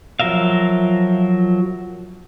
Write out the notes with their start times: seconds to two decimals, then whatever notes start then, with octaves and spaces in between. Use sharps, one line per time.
0.19 F3 F#3 A#4 E5 F5